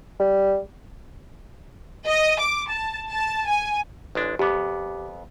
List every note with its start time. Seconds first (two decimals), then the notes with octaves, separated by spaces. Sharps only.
0.20 G3
2.06 D#5
2.40 D6
2.69 A5
3.10 A5
3.47 G#5
4.15 A1 G#3 D4
4.39 F2 B3 G4 D6